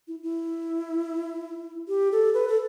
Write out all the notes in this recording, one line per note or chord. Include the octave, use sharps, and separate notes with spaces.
E4
E4
G4
A4
B4
A4